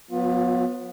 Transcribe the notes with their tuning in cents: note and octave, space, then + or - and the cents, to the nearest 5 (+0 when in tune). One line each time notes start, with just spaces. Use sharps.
F#3 -30 B3 +0 F4 +30